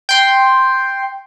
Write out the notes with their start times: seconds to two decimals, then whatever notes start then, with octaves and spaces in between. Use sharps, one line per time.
0.09 G5 C6